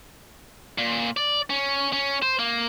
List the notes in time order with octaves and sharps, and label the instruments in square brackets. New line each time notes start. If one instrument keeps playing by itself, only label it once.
[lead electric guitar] A#2
D5
C#4
C#4
C5
A#3